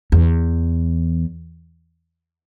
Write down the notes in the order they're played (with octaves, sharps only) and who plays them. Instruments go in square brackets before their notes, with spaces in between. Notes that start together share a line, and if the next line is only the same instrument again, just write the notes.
[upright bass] E2